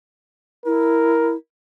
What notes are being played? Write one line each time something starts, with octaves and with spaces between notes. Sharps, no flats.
E4 A#4